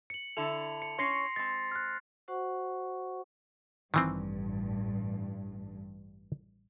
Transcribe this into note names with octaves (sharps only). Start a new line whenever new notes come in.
C#7 F#7
D3 E4 A4 F7
C#7
C#4 C#5 C6 A#6 C7
G#3 C4 A6
F6 F#6
F#4 C5 F#5 C#6
A1 G2 D#3 E3 C4